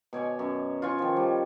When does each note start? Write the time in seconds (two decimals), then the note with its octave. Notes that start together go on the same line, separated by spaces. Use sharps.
0.13 B2 C#5 D5 G#5
0.39 F#2
0.82 F4 C#5 G#5 C#6
0.99 D#3 F3
1.16 G3